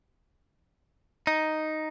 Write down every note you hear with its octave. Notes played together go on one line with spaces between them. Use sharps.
D#4